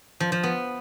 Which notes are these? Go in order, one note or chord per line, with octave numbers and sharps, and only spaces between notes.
F3
F3
B3